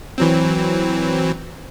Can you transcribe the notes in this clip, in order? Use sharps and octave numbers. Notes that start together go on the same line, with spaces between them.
E3 F#3 C4